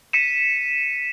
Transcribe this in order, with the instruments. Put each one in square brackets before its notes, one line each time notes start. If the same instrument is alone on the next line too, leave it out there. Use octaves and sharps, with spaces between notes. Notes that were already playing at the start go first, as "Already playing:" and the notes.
[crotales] B6 C#7 D#7 E7